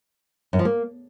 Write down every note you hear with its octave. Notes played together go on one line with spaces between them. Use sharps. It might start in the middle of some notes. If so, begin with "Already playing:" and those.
F#2
F3
A#3